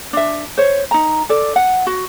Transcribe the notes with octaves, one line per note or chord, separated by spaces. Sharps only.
D4 E5
C5 C#5
D#4 A#5
A4 D5
F#5
F#4